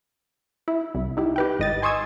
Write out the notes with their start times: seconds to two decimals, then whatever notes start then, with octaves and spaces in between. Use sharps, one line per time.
0.68 E4
0.95 C2
1.17 D#4 E4 G4
1.36 G4 B4 G5
1.59 G#1 D#5 A6
1.82 G#5 C6 C#6 D#6 E6 G#6